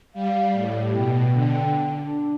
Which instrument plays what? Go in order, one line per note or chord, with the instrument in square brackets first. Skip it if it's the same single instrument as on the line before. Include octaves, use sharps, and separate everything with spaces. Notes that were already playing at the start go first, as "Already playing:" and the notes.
[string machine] G3 [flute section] F5
[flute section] D5
[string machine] A2
[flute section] G4
[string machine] B2 [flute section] G5
[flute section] G5
[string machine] D3
[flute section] G5
D4
D4